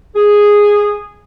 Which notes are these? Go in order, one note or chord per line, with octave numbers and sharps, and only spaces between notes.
G#4